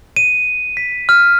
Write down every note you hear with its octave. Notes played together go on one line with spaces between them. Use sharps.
D#7
B6
F6